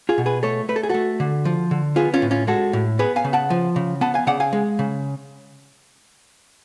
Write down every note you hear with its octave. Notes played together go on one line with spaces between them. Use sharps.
F4 G#4
B2
G#4 B4
A3 A4 C#5
A3 B4
A4
G#4
A3 F#4 A4
D3
F3
D3
B3 F4 G#4
C#4 F4
A2
C#4 F4
G#3 F#4 A4
A2
B3 G#4 B4
F5 G#5
C#3
F#5 A5
F3
C#3
B3 F#5 A5
F5 G#5
C#3 D5 F#5
F5 G#5
G#3
C#3